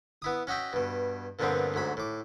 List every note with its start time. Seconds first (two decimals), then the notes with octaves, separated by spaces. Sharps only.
0.22 B3 E4 D#6
0.47 C#4 F#4 D#5 E5 G5
0.73 G2 B2
1.39 G2 A#2 D3 F3 B3 C4
1.74 D2 G#2 F#3 B5
1.97 A2 D6